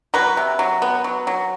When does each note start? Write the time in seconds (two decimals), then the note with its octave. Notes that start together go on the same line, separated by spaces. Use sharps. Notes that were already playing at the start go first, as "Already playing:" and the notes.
0.14 F#3 B4
0.37 C3
0.59 F#3
0.82 B3
1.04 F#3
1.27 F#3